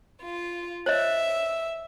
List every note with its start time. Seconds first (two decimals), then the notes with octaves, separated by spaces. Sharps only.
0.21 F4
0.86 C5 C#5 D#5 E5